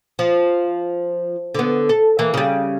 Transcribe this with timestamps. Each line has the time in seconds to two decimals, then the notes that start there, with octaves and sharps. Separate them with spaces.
0.19 F3
1.54 D3 B3
1.89 A4
2.19 E3 A#3
2.34 C#3 G3